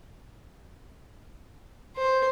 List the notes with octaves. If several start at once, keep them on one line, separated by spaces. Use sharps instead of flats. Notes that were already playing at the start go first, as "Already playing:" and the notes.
C5